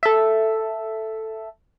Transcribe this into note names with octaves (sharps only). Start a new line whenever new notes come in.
A4 E5